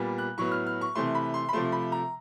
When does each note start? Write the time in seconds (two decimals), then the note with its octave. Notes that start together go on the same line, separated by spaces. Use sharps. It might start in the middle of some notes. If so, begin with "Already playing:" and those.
Already playing: A#2 G3 B3
0.18 F#6
0.38 A2 F#3 B3 C#6
0.52 F6
0.67 F6
0.81 C#6
0.95 C3 E3 A3 C6
1.15 B5
1.34 C6
1.49 B5
1.53 C3 F3 A3 C6
1.72 B5
1.92 A#5